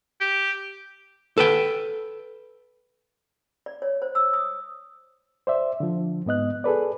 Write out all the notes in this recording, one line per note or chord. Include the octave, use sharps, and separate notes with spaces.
G4
A4 B4 G5
D5
C#5
C5
E6
D#6
C5 D5 E5
D3 F3
G#2 B3 D#5 F#6
G#4 A4 B4 D5